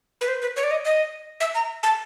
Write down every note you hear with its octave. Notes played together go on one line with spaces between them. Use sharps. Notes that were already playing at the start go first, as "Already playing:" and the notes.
B4
C5
B4
C#5
D5
D#5
D#5
E5
A#5
A5